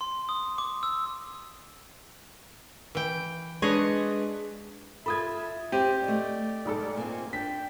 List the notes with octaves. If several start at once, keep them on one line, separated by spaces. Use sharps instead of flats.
C6
D#6
D6
E6
E3 G5
G#3 D4 G#4 B4 C#5 D#5
F4 A4 E5 B5 D#6 G#6
C4 G4 D#7
A3 D5 D#5
B1 G#2 A4
A#3 C4 F4 G#5
D4 G5 B6